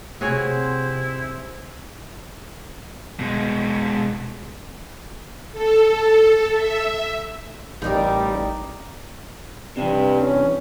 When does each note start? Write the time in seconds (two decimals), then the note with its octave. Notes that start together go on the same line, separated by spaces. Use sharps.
0.21 C3 E4 F#4 G#4 C5 C#5
3.19 B2 G#3
5.52 A4
6.53 E5
7.82 A1 G3 D#4 A#4 D5
9.77 G2 C3 E3
10.21 C#4